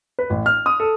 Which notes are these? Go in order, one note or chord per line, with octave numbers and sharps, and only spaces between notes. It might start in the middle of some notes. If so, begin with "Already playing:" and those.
B4
A1
F6
D#6
A4